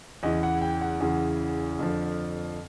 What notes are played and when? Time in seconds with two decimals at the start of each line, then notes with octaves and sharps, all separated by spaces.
0.23 E2 C#3 E3 D#5
0.43 F#5
0.62 G5
0.81 F#5
1.00 E2 C#3 E3
1.79 F2 D3 F3